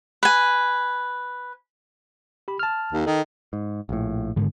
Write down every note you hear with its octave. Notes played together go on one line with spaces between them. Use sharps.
B4 G#5
G4 B5
A5 F6
D#2
D#3 A4 D#5
G#2
A#1 A2
G#2 D3 D#3